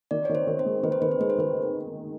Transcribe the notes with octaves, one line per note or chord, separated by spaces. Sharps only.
D#3 D5
D#3 C#5
C5
D#3
C5
G#3
D#3 B4
C5
D#3 B4
C5
G#3 B4
C5
D#3 B4